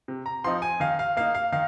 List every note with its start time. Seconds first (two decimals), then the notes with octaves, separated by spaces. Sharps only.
0.08 C3
0.26 A#5
0.44 F3 C4 D#4 C6
0.62 G#5
0.80 D#3 F5
0.99 F5
1.17 A#3 D#4 F5
1.35 F5
1.52 D#3 F5